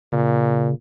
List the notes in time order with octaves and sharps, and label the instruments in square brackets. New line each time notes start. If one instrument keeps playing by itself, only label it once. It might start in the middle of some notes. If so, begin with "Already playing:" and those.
[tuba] A#2 [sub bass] C#3